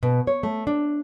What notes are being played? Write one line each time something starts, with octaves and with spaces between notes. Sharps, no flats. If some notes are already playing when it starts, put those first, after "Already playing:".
B2
C#5
A3
D4